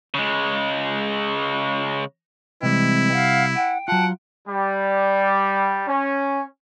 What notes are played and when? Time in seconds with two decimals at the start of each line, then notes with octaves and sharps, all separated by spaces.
0.14 C#3 G#3
2.63 C3 E3 G3 G#3 C4 E4
3.13 F5 F#5
3.56 F#5 G5
3.88 F#3 F4 F#5 A5
4.48 G3
5.87 C#4